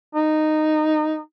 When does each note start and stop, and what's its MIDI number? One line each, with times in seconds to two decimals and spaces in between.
0.15 1.19 63